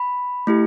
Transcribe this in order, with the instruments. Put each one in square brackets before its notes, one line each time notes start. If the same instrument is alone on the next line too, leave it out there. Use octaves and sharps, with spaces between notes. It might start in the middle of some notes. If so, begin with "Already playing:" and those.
Already playing: [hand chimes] B5
A3 E4 G4